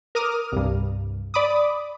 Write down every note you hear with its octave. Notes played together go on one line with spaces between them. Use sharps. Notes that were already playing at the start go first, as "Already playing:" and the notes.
A#4 D6 D#6 F6
C2 G2
D5 B5 D6 D#6